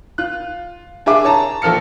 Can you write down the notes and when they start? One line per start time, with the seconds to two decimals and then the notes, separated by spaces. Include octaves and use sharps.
0.18 F4 F#6
1.06 D4 G#4 E5 D6
1.24 C#5 A5 A#5
1.62 A#1 F3 A4 F6 C#7